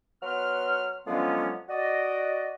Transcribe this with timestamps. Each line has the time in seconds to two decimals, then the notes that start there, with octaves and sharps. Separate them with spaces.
0.23 F#3 B3 C6 F6
1.06 D3 F3 F#3 G#3 B3 C#4
1.69 F#4 D5 D#5